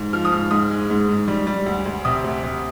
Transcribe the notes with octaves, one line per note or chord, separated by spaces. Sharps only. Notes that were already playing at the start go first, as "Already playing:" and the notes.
Already playing: G#2
F3 F6
D#6
G#2 F6
G#2 D#6
G#3
G#2
G#2
G3
G3
D2
D2
C3 D#6
D2
C3